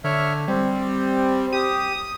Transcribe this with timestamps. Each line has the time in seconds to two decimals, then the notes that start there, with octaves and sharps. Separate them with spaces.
0.04 D3 C#5 E5 F6
0.48 G3 C4
1.53 G4 D#6